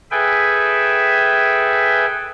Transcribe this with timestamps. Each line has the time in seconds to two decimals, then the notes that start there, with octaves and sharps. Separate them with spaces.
0.11 G#4 A4 B4 E5 G5 G#5